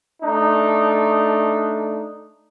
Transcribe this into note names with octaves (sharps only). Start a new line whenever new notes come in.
A3 D4 D#4